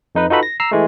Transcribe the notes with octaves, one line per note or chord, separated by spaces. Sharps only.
F2 D#4 B4
D#4 F4 F#4 A4 B4 B5
A#6
A#5 E6 C7
E3 G#3 A3